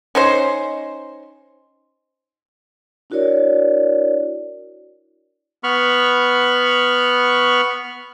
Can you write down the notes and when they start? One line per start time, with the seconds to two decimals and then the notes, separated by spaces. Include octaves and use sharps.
0.15 C#4 D#4 C5
3.10 D4 E4 F#4 A#4 C#5 D5
5.64 B3 B5 C#6 F6